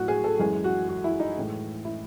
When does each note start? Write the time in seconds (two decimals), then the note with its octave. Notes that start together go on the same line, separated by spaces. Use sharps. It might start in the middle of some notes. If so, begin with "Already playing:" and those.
Already playing: A2 F#3 F#4
0.08 G#4
0.24 A4
0.39 F#2 E3 G#3 G#4
0.64 F#4
0.89 F#4
1.04 E4
1.20 D#4
1.36 A2 E3 G#3
1.85 E4